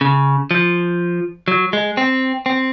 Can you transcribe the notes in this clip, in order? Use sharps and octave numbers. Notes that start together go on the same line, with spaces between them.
C#3
F3
F#3
G#3
C4
C4